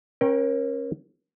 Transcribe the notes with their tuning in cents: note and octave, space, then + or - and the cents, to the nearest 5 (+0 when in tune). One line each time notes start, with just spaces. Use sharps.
C#4 -30 A#4 +25 G5 -5